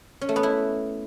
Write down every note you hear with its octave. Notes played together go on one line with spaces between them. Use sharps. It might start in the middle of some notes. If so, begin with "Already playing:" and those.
C#4
A3
B3
E4